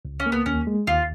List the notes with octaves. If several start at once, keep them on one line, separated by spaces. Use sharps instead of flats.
C#2
C#4
A#3
B3
D#2 C#4
G#3
D#2 F4